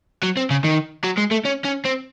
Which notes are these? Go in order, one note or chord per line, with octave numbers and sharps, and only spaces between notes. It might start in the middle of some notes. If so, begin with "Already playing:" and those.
F#3
C4
C#3
D#3
F#3
G#3
A3
C#4
C#4
C4